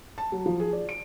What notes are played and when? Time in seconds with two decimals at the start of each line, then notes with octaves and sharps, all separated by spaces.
0.18 A5
0.32 F#3
0.46 F3
0.60 G#4
0.73 D5
0.89 D7